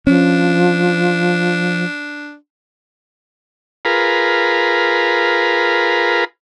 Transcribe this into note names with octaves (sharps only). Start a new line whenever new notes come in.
F3 C#4 D4
F4 G#4 A#4 B4